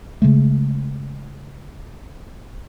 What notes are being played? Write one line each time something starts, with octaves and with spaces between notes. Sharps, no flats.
C#3 G#3 A3